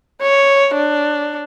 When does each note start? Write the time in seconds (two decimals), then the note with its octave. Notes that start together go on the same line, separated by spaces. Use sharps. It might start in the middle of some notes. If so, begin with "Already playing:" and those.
0.22 C#5
0.76 D4